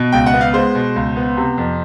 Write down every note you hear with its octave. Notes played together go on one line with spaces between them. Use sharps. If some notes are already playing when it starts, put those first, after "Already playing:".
Already playing: B2
C#2 G5
F#5
B3
F5
G#3 C5
B2
C#2
B3
C3
F2